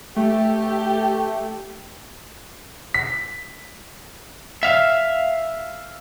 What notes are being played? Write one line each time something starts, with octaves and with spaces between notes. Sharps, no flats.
A3 G4
B6
E5 F5